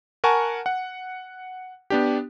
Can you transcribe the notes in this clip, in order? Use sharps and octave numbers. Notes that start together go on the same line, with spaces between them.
A#4 F#5 G#5 A5 C#6
F#5
B3 D4 G4